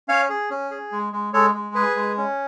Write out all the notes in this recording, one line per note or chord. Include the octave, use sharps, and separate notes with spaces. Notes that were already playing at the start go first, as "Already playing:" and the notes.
C#4 C#5 F5
G#4
C#4
G#4
G#3
G#3
G#3 A4 C#5
G#3
G#4 B4
G#3
C#4